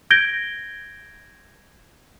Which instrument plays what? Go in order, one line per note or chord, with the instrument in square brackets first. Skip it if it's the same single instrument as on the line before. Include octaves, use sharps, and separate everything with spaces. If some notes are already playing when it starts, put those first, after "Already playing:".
[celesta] G6 G#6 A#6 D7 G7